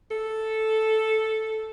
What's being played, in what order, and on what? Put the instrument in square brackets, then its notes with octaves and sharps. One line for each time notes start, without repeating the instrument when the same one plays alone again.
[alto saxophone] A4